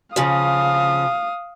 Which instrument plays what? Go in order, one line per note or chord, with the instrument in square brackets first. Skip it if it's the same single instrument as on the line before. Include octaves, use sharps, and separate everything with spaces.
[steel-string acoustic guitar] C#3 F3 [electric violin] F5 D#6